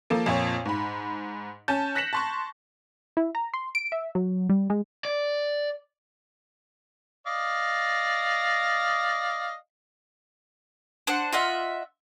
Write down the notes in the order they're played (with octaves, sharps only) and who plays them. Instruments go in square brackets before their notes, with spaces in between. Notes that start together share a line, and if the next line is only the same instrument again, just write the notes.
[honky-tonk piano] F3 A#3 A4
F2 A#2 C4 C#5
G#2 B5
C#4 A5 G6
F#6 A#6 B6 C#7 E7 F#7
A5 C6 C#6
[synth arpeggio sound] E4
A#5
C6
D7
E5
F#3
G3
G#3
[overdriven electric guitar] D5
[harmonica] D5 D#5 F5
[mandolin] D4 C5 F#5
F4 D#5 E5 F#5